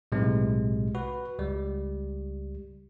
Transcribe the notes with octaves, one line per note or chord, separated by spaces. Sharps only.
B1 A2 C3 G#3
F#4 B4
C#2 G3